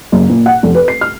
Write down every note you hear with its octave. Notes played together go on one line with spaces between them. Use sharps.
F#1
A#2
F#5
F1
B4
C7
F6